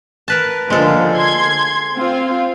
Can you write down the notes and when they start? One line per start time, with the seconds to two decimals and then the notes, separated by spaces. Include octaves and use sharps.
0.28 A#4 B4 A5
0.70 D3 F3 G#3 A#3 A4
1.13 C6 G#6
1.96 C4 F4 F5